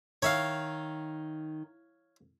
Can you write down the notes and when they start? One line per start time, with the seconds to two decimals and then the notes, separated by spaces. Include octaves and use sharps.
0.22 D#3 C#5 E5 F5